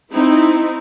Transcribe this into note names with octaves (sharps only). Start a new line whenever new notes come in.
C4 D#4 E4